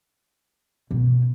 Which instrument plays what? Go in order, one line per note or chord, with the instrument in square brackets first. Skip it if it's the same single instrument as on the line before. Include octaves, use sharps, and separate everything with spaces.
[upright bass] B2